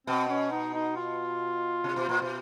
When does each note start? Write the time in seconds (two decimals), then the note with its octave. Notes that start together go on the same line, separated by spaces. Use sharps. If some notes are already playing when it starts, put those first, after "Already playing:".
0.07 B2 C4
0.29 C#4
0.51 D#4
0.74 D#4
0.96 F4
1.84 C3
1.96 B2
2.09 A#2
2.22 B2